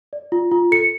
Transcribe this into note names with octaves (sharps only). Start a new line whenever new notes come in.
D5
F4
F4
A4 C#7